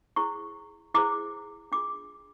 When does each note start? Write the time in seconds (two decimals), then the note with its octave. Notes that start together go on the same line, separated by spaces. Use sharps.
0.16 E4 G#4 C5 C#6
0.94 E4 G#4 C5 D6
1.72 D4 F4 G#4 D6